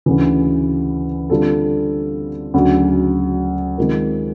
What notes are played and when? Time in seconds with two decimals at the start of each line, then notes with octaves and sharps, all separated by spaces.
0.06 D2 C#3 E3
1.30 D3 G3 C4 F4 A4
2.54 D2 C#3 F#3
3.78 D#3 G#3 C4 F4 A#4